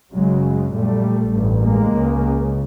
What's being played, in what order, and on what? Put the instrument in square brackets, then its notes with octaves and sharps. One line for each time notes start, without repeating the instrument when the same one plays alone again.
[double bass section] F#1 F#2 C#3 F#3 G#3
A#1 A#2 G3 A3
A1 G2
G#3 A#3
C#2 C#3